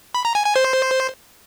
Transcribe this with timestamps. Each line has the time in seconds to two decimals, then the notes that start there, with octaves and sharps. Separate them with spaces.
0.14 B5
0.25 A#5
0.35 G#5
0.45 G#5
0.56 C5